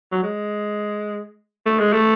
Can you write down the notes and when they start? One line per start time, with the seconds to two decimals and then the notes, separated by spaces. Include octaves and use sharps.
0.12 F#3
0.23 G#3
1.66 A3
1.79 G#3
1.93 A3